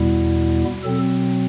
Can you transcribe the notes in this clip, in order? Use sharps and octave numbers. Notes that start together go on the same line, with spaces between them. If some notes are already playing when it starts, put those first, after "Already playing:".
Already playing: E2 B2 G3 B3 E4
B2 F#3 C4 A4